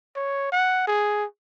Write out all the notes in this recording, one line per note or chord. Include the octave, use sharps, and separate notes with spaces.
C#5
F#5
G#4